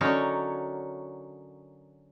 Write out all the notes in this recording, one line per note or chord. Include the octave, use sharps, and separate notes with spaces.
D3 F#3 C#4 D#4 A#4 C#5